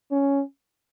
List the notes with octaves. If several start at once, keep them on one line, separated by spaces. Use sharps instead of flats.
C#4